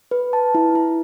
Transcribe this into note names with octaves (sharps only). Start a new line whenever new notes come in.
B4
A5
E4
E4